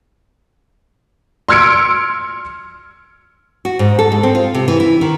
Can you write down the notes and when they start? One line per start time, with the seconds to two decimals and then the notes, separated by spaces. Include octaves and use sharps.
1.49 C6 E6 F6 G#6 C#7 D7
3.65 F#4
3.79 G#2
3.99 A4
4.12 G#3
4.23 C4
4.35 F4
4.54 C3
4.68 E3
4.80 E4
5.01 D#3